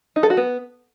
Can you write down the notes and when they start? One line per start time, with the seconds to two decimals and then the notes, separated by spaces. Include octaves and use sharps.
0.16 D#4
0.23 A4
0.30 F#4
0.37 B3